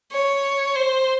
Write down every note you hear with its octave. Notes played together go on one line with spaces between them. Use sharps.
C#5
C5